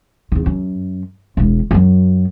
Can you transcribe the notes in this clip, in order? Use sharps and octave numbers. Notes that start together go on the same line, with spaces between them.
E2 D#3
F#2
E1 G#3
F#2 F#3